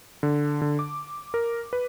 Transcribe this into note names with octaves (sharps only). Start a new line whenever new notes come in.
D3
D3
D6
A#4
B4